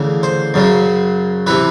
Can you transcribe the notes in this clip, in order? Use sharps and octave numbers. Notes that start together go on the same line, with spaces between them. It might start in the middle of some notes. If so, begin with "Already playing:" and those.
Already playing: D2 C#3 E3
C5
F#2 C#3 F#3
C3 E3 B4